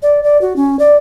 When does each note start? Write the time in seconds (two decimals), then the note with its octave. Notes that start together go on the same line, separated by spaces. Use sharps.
0.02 D5
0.23 D5
0.41 F#4
0.56 C#4
0.79 D5